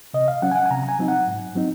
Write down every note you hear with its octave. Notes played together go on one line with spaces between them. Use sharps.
C3 D#5
F5
F#3 C#4 F#5
G#5
F#5
G#5
C3 A#5
A#5
G#5
F#3 C4 D#4
F#5
G#2
F#3 C4 D#4